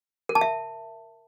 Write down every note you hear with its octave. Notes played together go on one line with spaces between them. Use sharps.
A#4
A5
E5